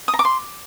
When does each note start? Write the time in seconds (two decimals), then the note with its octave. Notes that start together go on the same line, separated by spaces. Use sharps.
0.08 D#6
0.14 A#5
0.19 D6
0.25 C6